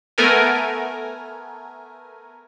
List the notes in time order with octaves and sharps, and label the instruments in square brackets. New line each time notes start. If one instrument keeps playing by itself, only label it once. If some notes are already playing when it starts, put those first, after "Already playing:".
[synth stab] A3 B3 A#4 G#5